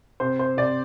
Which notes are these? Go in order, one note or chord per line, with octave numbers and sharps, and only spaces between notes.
C3 C5
C5
C3 D5